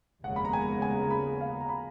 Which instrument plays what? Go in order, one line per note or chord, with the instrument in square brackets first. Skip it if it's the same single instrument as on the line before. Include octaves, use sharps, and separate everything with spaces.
[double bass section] F1 D#2 C#3 G#3 B3 [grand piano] F#5
[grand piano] B5
A#5
G#5
G#5
A#5
B5
F5
A#5
B5